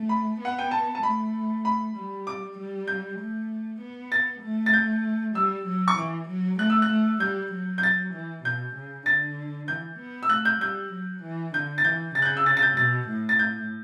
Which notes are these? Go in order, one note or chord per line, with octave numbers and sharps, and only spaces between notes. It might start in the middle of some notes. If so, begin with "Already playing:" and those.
Already playing: A3
B5
B3 F#5
G5
A5
A5
A3 B5
B5
G3
D6
G3
G6
A3
B3
A6
A3
A6
G6
G3 E6
F#3
C#6
E3 D6
F#3
A3 F#6
E6
F#6
A3
G3 G6
F#3
G6
A6
E3
B2 G6
C#3
D3 A6
E3 G6
B3
E6
A3 F#6
G6
G3 G6
F#3
E3
D3 G6
A6
E3 G6
C#3 A6
F#6
G6
E6
A6
A6
G6
B2 A6
A2
A6
G6